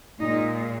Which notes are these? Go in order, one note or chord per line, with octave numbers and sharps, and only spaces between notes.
A#2 G#3 D#4